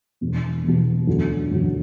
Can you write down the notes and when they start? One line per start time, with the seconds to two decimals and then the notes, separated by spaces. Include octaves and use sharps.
0.21 E1 E2 B2
0.64 E1 E2 B2
1.07 E1 D2 D3 F#3
1.50 E1 D2 D3 F#3